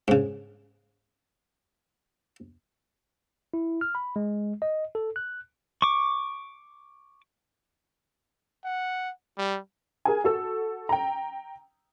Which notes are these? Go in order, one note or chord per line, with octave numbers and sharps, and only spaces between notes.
G#2 C#3
E4
F6
B5
G#3
D#5
A4
F#6
C#6 D6
F#5
G3
G#4 A#4 G#5
F#4 A4 E6
G5 A#5